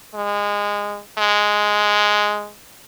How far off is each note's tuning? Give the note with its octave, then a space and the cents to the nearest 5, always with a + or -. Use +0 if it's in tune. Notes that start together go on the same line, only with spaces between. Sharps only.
G#3 -20
G#3 +0